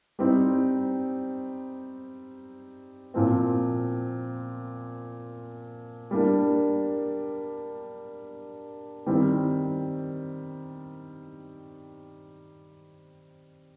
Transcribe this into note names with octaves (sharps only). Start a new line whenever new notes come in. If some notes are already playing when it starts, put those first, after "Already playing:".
G3 C4 D#4
A#2 F3 C4
G3 A#3 D4
D#3 G3 C4